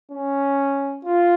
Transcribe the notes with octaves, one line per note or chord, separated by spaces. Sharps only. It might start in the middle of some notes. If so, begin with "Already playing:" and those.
C#4
F4